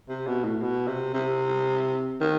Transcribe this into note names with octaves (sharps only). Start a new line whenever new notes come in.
C3
B2
A2
B2
C3
C3
D#3